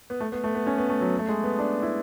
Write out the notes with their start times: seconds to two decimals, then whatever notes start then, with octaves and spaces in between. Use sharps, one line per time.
0.10 B3
0.20 A3
0.32 B3
0.44 A3
0.55 B3
0.67 C#4
0.78 B3
0.90 A3
1.01 F#3
1.19 A3
1.29 G#3
1.44 B3
1.59 D4
1.82 E4